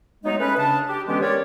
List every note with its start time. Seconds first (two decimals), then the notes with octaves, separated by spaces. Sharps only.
0.24 F#3 G#3 A3 B3 D#4
0.40 A3 C#4 G#4 B4
0.57 C#3 D4 A5
0.88 G4
1.08 D3 E3 G#3 B3 C#4 G4
1.22 G4 A#4 C#5 D5